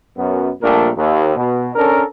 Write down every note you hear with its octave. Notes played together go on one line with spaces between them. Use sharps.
F#2 B3
A#1 A#2 G3 A3 D4 A#4
D#2
B2
C#4 D4 A4 A#4